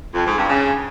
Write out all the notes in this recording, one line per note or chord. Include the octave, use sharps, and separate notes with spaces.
F2
G#2
G2
C#3